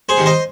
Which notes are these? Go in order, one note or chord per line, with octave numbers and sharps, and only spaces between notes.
G#4 C5
C3 D#3
C5 D#5